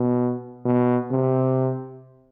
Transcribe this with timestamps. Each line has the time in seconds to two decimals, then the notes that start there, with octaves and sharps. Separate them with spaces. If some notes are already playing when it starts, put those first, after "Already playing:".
Already playing: B2
0.65 B2
1.11 C3